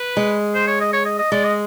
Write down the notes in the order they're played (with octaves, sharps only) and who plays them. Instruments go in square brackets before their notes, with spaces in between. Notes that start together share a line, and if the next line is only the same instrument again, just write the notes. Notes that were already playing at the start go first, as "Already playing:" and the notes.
Already playing: [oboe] B4
[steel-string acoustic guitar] G#3
[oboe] C5
C#5
D#5
C#5
D#5
D#5
[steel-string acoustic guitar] G#3 [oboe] D5
[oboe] D#5